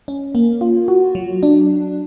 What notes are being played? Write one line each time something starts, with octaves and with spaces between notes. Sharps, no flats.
C#4
A#3
F4
F#4
F#3
D4